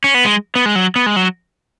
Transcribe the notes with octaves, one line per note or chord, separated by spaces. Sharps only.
C#4
B3
G#3
B3
G#3
F#3
B3
G#3
F#3